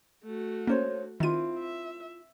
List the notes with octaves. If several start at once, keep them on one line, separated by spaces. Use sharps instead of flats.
A3 F#4
A#3 C#4 D4 C5 C#5
D#3 C4 E4 F4 D#7
E5